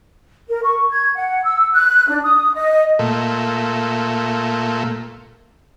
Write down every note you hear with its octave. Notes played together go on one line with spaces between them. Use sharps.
A#4
C#6
G#6
F#5
E6
F#6
D4
D#6
D#5
A#2 A3